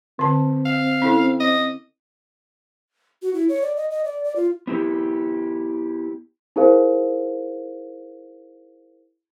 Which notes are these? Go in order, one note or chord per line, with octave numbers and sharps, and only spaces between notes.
D3 C4 A5
F5
C#4 E4 A4
D#5
F#4
E4
C#5
D5
D#5
D#5
D5
D5
F4
B3 E4 G4
D#4 E4 G#4 A#4 C5 F5